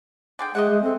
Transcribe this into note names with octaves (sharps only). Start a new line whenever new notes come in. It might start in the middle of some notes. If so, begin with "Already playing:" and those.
D3 G#4 G5
G#3 G#4 D#5 E5 F#5
G#3
C4 A4